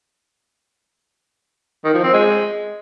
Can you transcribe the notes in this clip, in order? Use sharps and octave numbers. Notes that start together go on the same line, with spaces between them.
D#3
F3
C4
G#3